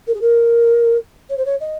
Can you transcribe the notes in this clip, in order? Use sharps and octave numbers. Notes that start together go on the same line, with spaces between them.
A#4
G#4
A#4
C#5
C5
C#5
D#5